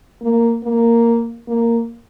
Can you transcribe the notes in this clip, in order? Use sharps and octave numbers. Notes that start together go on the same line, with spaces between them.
A#3
A#3
A#3